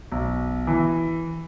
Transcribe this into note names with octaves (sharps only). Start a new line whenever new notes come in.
B1
E3